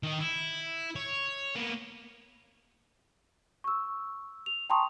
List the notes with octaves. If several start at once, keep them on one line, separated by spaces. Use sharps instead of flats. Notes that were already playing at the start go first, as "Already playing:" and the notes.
D#3 D#5
E4
C#5
A#3 B3
C#6 E6
F7
G5 A5 A#5 C6 C#6 D#6